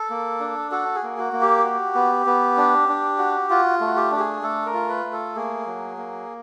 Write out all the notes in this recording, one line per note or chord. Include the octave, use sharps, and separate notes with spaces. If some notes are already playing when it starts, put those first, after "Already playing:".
Already playing: A4
A#3
D4
F#4 A4
G#4
A#3
F#4
A#3
G4
F#4
B3
B3
D4
D4
F#4
F4 F#4
A3
F#4
G4
D4 G4
G#4
A3 A4
A#4
F4
B4
A3
A4
A#3 G#4
F#3
A#3